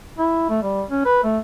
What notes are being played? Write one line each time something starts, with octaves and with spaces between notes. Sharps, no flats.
E4
A3
G3
C#4
B4
A3